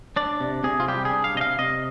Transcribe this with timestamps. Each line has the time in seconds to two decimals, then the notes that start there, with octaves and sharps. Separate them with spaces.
0.16 D4 D5
0.40 C3
0.64 C3 G#4
0.80 F4
0.88 G3 G4
1.05 G#4
1.12 D4
1.24 F5
1.35 C3 D#5
1.41 F5
1.59 C3 D#5